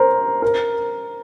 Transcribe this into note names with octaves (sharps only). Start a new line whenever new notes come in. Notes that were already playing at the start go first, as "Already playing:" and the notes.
Already playing: A#4 C5
A#4